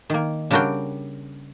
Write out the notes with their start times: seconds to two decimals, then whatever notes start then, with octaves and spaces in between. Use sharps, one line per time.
0.10 D#3 A#3
0.51 C#3 G3 D4 F#4 A#4 G5